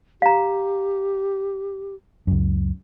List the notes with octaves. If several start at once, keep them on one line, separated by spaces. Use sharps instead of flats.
G4 F5 A#5
C#2 F#2